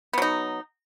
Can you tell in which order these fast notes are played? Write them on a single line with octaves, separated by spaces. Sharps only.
B3 F#3 D#4